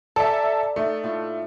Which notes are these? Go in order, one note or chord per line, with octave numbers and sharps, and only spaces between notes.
A4 D5 E5 G#5 A#5
A3 D#4 A4
A2 F4